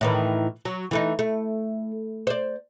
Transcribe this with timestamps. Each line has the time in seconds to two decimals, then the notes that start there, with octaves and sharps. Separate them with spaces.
0.01 A2 D#3 E3
0.65 F#3
0.91 E3 A3 D#4
1.19 A3
2.27 C5 D5